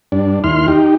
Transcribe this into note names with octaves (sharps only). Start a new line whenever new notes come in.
G2 D4
D#2 E4 C6 F6
D#4 G4